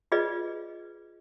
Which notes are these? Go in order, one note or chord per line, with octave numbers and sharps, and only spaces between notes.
F4 G#4 B4 D5 D#5